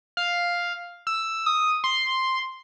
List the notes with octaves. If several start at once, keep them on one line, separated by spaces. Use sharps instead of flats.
F5
E6
D#6
C6